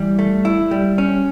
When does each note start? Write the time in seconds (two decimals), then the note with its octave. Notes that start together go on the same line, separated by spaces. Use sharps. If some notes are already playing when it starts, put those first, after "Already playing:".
Already playing: E3 G3
0.19 A3
0.45 E4
0.71 G3
0.98 C#4